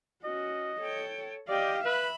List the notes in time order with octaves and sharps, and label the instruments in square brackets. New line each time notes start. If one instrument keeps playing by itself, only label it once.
[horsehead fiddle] C#4 F#4 [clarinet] D#5
[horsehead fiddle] A4 C#5 [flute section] G5
[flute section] G4 G5 [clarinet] D5 [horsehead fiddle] D#5 F5
[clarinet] B4 [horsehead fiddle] E5 [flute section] B5